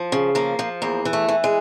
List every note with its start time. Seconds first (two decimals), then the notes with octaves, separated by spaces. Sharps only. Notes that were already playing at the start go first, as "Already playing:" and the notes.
Already playing: F3
0.12 C#3
0.35 F3 A#3
0.59 F3
0.82 E2 A#3
1.05 E3
1.13 A3
1.29 E3
1.44 G#3